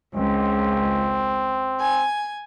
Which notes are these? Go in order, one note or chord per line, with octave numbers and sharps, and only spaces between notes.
C#2 C4
G#5